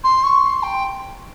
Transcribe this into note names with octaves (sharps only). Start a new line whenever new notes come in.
C6
C#6
C6
G5